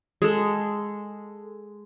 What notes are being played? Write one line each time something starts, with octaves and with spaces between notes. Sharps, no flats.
G#3 A4